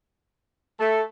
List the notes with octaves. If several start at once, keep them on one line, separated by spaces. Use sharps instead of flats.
A3 A4